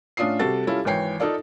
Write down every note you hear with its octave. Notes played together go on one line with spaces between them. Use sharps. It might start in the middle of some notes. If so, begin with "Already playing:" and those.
A2 C#4 D4 F4 D#6 C7
C3 G3 F#4 A4 A6
G3 C#4 E4 F4 A4
G#1 E3 C#5 G5 C7
D#4 F4 A4 D5 F5